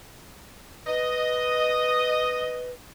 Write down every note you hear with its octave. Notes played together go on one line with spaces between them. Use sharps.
B4 D#5